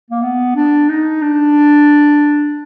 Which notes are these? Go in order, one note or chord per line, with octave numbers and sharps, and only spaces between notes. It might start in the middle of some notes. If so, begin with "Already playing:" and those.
A#3
B3
D4
D#4
D4